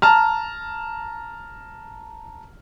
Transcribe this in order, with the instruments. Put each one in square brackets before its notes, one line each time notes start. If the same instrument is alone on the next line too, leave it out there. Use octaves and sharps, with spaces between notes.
[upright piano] A5 A#5 F6